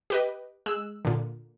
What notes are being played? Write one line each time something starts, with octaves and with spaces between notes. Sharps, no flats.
G4 B4 D#5
G#3 E6 F#6
A#2 D3